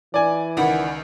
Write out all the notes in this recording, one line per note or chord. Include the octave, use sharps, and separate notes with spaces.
E3 D5 G#5
C#2 D#3 E5 F#5 B5